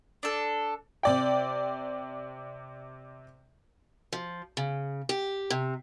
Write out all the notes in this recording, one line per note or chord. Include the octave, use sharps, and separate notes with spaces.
D4 A4
C3 D5 G5
F3
C#3
G4
C3